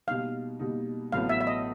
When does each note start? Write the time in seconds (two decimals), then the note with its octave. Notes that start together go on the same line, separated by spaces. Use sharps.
0.07 B2 G3 A#3 D#4 F5
0.59 B2 G3 A#3 D#4
1.12 A1 A2 F#3 B3 F5
1.29 E5
1.41 E5
1.47 D#5